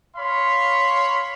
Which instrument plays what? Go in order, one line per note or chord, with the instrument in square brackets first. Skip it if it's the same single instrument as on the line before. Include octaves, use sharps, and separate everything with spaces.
[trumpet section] C#5 F5 B5 C6